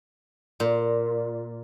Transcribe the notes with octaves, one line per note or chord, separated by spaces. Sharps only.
A#2